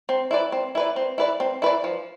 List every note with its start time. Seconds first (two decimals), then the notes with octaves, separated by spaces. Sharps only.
0.09 C4
0.31 E4 B4 D5
0.52 C4
0.75 E4 B4 D5
0.96 C4
1.18 E4 B4 D5
1.40 C4
1.62 E4 B4 D5
1.84 F3